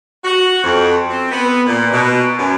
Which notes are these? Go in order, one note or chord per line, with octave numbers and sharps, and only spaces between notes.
F#4
F2
C4
B3
A#2
B2
F#2